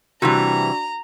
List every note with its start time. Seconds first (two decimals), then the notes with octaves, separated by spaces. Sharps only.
0.22 C3 E3 G3 D4 F#4 A#5